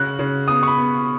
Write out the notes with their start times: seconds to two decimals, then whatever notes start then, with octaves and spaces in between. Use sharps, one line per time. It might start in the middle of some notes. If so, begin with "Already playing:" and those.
Already playing: C#3 F#4 F#6
0.19 C#3
0.48 B3 D#6
0.63 C#6
0.68 B5
0.77 B3